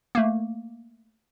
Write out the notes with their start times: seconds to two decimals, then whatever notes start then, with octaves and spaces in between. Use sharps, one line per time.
0.15 A3 A#3